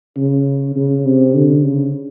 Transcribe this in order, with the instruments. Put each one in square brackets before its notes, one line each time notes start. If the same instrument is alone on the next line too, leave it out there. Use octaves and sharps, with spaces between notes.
[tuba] C#3
C#3
C3
D3
C#3